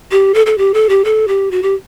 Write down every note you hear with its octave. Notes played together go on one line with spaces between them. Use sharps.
G4
A4
A4
G4
A4
G4
A4
G4
F#4
G4